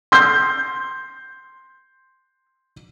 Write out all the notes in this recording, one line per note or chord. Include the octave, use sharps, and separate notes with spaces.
C6 G6